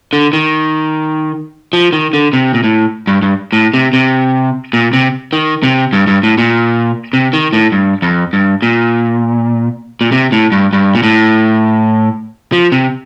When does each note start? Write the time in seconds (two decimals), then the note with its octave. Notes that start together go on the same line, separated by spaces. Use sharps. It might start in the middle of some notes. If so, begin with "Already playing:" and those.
0.13 D3
0.33 D#3
1.73 F3
1.93 D#3
2.13 D3
2.33 C3
2.54 A#2
2.64 A2
3.07 G2
3.22 G2
3.53 A2
3.74 C3
3.93 C3
4.73 A#2
4.93 C3
5.33 D#3
5.63 C3
5.93 G2
6.07 G2
6.23 A2
6.38 A#2
7.13 C3
7.33 D#3
7.53 A2
7.72 G2
8.02 F2
8.33 G2
8.62 A#2
10.01 A#2
10.12 C3
10.32 A2
10.52 G2
10.73 G2
10.95 A#2
11.03 A2
12.52 F3
12.72 C3